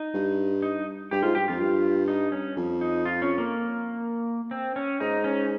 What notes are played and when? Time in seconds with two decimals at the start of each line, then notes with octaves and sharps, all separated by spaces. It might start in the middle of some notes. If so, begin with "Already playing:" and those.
Already playing: D#4
0.13 G2
0.62 D#4
1.11 G2 G4
1.23 G#2 F4
1.35 G2 G4
1.48 F2 F4
1.59 G2
2.08 D#4
2.32 C#4
2.57 F2
2.81 D#4
3.05 F4
3.22 C#4
3.38 A#3
4.51 C4
4.76 C#4
5.00 G#2 D#4
5.24 C#4